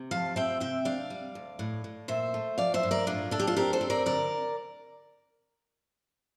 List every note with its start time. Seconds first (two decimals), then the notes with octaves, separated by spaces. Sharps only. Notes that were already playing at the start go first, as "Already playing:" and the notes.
Already playing: C3
0.11 F3 F5 A5
0.36 C4 E5 G5
0.60 C3 E5 G5
0.85 D4 D5 F5
1.10 G3
1.35 D2
1.59 A2
1.84 A2
2.08 A#2 C5 E5
2.34 A3
2.58 F3 D5 F5
2.74 C5 E5
2.83 G2
2.91 A#4 D5
3.07 A2 D4 F4
3.31 D4 A4
3.40 G4
3.47 F4 A4
3.57 C4 G4 A#4
3.73 A4 C5
3.81 C4
3.90 A#4 D5
4.06 D3 A#4 D5